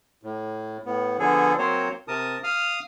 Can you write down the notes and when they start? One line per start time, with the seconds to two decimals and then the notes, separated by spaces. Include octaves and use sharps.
0.23 A2
0.86 A2 B3
1.19 D3 F3 B3 G#4 A4
1.58 F#3 A#3 C4 C5 C#5
2.08 C3 A#4 A5 D#6
2.43 F5 D#6 F6